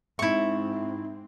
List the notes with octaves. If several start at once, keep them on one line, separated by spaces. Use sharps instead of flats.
G#2 C4 D#4 E4 E5 C#6